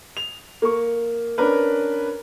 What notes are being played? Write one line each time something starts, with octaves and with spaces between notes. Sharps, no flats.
F7
A#3 C#6
C#4 D4 A#4 B4